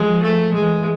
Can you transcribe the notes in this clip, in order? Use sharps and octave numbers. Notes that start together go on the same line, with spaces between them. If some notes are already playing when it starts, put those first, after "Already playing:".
Already playing: F3 G#3
A3
E3 G#3